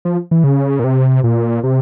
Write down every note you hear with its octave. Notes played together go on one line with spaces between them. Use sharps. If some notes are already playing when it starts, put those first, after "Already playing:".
F3
E3
C#3
A#2
C3
A#2
C3